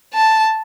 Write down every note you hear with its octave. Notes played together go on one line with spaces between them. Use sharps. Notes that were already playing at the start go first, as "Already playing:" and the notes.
A5